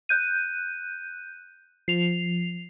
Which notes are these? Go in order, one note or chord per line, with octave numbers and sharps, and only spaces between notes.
F#6 G6 D#7
F3 C7 F7